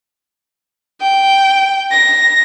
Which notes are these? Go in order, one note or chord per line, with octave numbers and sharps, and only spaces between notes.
G5
A#6